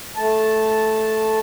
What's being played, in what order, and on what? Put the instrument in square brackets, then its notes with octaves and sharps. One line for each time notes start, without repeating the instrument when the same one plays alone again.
[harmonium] A3 A5